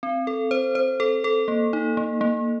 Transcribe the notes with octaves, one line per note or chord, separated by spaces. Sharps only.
C4
A4
C5
C5
A4
A4
A#3
D#4
A#3
A#3